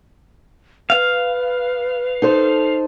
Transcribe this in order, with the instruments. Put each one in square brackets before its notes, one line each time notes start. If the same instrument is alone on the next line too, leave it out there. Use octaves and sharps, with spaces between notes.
[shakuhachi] B4 [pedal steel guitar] F5
[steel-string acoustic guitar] D#4 A4 C5